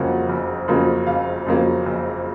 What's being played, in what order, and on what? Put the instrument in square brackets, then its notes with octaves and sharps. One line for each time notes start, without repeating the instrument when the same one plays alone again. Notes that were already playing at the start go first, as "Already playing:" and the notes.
Already playing: [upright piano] F#1 F2 C#3 F#3 A#3 F#5
F#1
F2 C#3 F#3 A#3
F#1 F5
F2 C#3 F#3 A#3
F#1